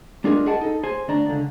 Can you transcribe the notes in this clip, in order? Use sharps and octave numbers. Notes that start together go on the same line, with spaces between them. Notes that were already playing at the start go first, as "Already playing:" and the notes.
G#3 D4 F4 G4 G#4 A#4
G#4 A#4 D#5 F#5 G5 A5
D#4 A4
G#4 C5 G#5
D2 D4 A#5
C#2 D3